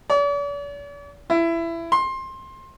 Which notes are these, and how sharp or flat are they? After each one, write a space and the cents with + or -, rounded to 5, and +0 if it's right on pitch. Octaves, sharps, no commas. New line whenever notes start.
D5 -45
E4 +20
C6 +20